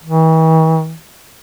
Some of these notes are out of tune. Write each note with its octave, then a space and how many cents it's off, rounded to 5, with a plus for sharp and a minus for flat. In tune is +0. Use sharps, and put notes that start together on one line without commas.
E3 -45